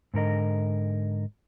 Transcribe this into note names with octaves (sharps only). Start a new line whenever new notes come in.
G#2 D3 A#4 D#5